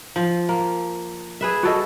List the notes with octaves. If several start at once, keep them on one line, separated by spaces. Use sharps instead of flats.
F3
A#3
G#4 B4 E5
F#4 A4 D#5